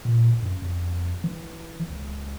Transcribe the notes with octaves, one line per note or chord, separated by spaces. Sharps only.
A#2
F#2
F2
E3
C#2